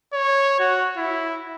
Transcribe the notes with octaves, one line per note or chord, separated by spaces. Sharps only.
C#5
F#4
E4